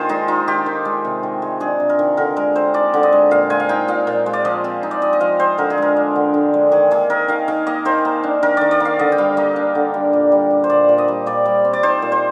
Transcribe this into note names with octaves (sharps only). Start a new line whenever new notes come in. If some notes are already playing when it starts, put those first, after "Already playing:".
Already playing: D#3 A#3 F4 G#4 C5
G#3 D#4
D#4 F4
D#3 G4
D#3
G#3
C3
D#3
G#3
D4 G#4
C3
A#4
D#3
D3 A#4
G#3 A#4
C4 C5
D#4 D5
D3
D#5
G#3
A#2 F5
G#3 G#5
F5
D#4 G5
A#2 F5
A#2
G#3
D5
F3 D#5
C4
D#4
D5
F3 D#5
D#5
F3 F5
C4 C5
D3 A#4
G#4
G#3 A#4
D4
D3
D3
G#3
D#3 G#4
A#3 G#4
D#4 A#4
D#3 F5
D#3 F5
A#3 D#5
D#3 C5
A#3
D4
D#3 A#4
D#3 D5
D5
A#3 F5
D3 D#5
G5
G3 F5
A#3 D#5
D4
D3
G3
A#2
G3
D4
C5
A#2 D5
A#2
D#5
G3
A#2 D5
G3
C4
D5
D#4 C5
A#2
C5